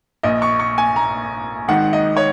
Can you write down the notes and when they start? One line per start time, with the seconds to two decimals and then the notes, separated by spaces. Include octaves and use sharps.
0.23 A#1 A#2 D#5
0.42 C#6
0.60 C#6
0.78 G#5
0.96 A#5
1.68 G#1 G#2 D#3 F#5
1.93 D#5
2.17 C#5